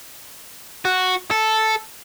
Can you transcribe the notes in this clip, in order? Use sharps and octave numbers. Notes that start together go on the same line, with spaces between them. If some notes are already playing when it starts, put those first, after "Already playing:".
F#4
A4